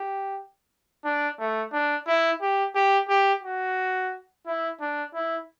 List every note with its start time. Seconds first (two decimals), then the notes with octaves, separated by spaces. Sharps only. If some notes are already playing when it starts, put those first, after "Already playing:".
Already playing: G4
1.05 D4
1.39 A3
1.72 D4
2.07 E4
2.41 G4
2.75 G4
3.09 G4
3.43 F#4
4.47 E4
4.80 D4
5.14 E4